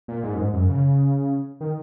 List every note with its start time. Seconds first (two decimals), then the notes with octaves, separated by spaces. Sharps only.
0.08 A#2
0.23 G#2
0.35 F#2
0.39 G#2
0.53 F#2
0.69 C#3
1.61 D#3